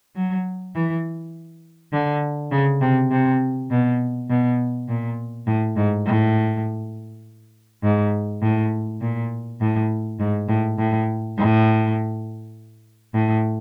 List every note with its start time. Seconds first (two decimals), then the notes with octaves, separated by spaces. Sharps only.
0.16 F#3
0.75 E3
1.93 D3
2.51 C#3
2.81 C3
3.11 C3
3.70 B2
4.29 B2
4.88 A#2
5.47 A2
5.76 G#2
6.05 A2
7.83 G#2
8.42 A2
9.01 A#2
9.61 A2
10.19 G#2
10.48 A2
10.78 A2
11.37 A2
13.14 A2